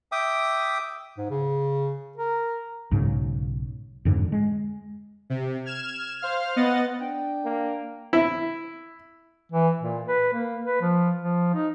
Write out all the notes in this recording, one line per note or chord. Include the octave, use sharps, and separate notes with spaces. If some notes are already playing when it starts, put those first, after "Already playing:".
E5 G5 D6 D#6
G#2
C#3
A#4
B1 G#2 C#3 F#3
F2 G#2 D3
G#3
C3
F6 G#6 E7
C5 F5 F6
B3 D#5 F#5 A6
D4 G5
A#3
E4
E3
A#2
B4
A#3
B4
F3
F3
D#4